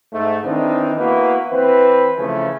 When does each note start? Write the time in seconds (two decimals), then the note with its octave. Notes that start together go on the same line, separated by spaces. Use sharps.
0.11 G#2 A3
0.43 D#3 E3 C4 D4 D#4
0.98 A#3 B3 E4 F#4 B4
1.52 E3 C4 B4
2.17 C#3 E3 F3 A3 C#4